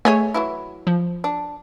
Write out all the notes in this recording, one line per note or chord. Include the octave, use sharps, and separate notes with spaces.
A3 G#4 C#5 D#5 G#5
E3 F#3 E4
F3
D4